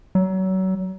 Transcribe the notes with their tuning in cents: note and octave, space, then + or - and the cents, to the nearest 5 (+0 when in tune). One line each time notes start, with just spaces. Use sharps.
F#3 +30